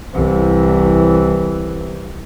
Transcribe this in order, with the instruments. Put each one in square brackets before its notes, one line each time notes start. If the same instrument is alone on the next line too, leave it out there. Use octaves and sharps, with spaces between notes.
[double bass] C2 E3